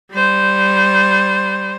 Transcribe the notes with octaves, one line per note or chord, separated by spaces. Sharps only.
G3 C5